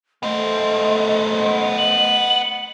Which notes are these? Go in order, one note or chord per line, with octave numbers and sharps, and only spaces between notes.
A3 B3 C5 D#5
F#7